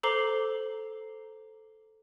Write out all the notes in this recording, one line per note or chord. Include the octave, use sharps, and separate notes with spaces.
A4 C5 A#5 D6 C7 G7